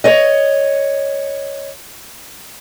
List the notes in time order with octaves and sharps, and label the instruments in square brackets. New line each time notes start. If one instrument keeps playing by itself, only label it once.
[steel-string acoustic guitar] C#5 D#5